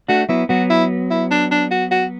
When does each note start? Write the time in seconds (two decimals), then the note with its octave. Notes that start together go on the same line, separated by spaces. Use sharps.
0.09 A3 D4 F#4
0.29 F#3 B3 E4
0.49 F#3 B3 F#4
0.70 E4
1.10 E4
1.31 D4
1.51 D4
1.71 F#4
1.91 F#4